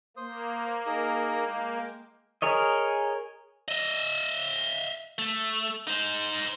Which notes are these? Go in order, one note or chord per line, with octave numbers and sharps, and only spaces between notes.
A#3 C5 D#6
D#4 G#4 A#4
G#3 G5
G#4 A#4 C#5 D#5
D#5 E5
A3
D#4 C5